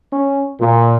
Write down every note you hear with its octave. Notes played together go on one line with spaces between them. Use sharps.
C#4
A#2